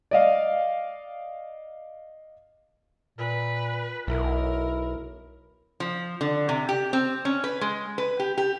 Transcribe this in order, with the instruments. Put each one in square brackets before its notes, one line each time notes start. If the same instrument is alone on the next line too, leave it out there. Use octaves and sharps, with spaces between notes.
[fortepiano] D5 D#5 F5
[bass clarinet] A#2 [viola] B4
[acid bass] B1 [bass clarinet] E4 [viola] A#4
[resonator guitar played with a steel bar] F3
D3
C3
G4
C4
C#4
B4
G#3
B4
G4
G4